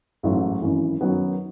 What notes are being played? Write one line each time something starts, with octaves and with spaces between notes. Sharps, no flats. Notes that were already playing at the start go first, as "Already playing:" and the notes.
A1 G#2 F#3 A3
G#1 F#2 E3
F#2 D#3 F#3 B3